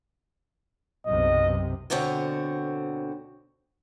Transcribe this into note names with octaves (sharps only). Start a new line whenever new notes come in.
B1 F#2 C3 D#5
D2 B2 D3 C4 C#5